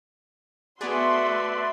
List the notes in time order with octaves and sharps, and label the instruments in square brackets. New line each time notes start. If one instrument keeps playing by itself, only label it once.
[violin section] A3 E5 C6 [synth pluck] B3 G#4 [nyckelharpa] F#4 [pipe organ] B4 D5